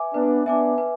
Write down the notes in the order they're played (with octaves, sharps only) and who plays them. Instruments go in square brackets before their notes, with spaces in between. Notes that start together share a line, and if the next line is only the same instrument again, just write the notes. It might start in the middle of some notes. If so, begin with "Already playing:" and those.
Already playing: [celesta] B4 E5 G#5 D6
[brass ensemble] B3 D4 [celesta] B4
[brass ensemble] B3 D4 [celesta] E5 G#5 D6
[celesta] B4